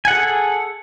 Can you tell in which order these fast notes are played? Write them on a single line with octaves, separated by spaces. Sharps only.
G#5 F#5 G#4 A4